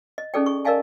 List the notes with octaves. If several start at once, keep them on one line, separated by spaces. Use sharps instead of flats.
D#5
C#4 D#4 G#4 A4 D5 G5
G#4 C#6
A#4 D5 D#5 F5 G#5 A5